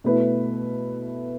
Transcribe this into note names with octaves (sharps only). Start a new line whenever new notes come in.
B2 A3 E4 B4